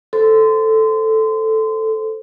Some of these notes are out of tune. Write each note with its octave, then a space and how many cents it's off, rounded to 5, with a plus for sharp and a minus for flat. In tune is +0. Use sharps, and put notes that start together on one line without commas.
A4 +0 C5 +0 C6 -25